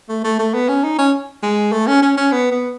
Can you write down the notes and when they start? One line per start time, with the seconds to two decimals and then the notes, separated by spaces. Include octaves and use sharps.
0.09 A3
0.24 A3
0.39 A3
0.54 B3
0.68 C#4
0.83 D#4
0.98 C#4
1.43 G#3
1.72 A3
1.87 C#4
2.02 C#4
2.17 C#4
2.32 B3
2.51 B3